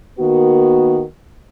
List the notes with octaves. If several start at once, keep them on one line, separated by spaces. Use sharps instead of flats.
D#3 A#3 B3 F#4